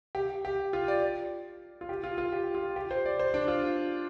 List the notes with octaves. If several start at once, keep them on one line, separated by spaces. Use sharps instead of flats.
G4
G4
F4
D5
F4
G4
F4
F4
G4
F4
G4
C5
D5
C5
D4
F4